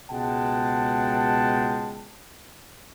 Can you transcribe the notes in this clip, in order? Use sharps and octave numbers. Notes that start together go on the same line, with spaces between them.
C#2 B2 G#3 F#5 G5 A5